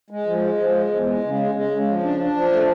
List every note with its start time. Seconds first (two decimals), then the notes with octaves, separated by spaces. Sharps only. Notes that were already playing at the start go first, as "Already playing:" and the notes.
0.10 G#3
0.26 F3
0.42 G#3
0.58 F3
0.75 G#3
0.90 E2
1.06 G#3
1.23 C#3
1.39 G#3
1.55 G#3
1.71 C#3
1.88 F3
2.03 D4
2.20 D4
2.36 F3
2.52 A3